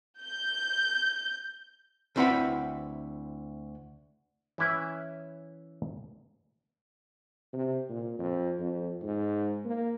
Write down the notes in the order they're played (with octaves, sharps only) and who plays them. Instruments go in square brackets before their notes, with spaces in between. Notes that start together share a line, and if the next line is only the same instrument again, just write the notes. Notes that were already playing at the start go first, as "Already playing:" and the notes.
[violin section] G6
[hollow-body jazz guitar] D2 C4 E4 B4 F#5 B5
[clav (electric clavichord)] E3 C#4 E4 B4 E5
[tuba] C3
A#2
F2
F2
G#2
A#3